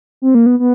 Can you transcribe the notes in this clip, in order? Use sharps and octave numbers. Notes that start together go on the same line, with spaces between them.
C4
A#3
B3
B3